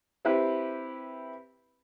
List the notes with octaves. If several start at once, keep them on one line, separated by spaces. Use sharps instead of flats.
C4 E4 G4 B4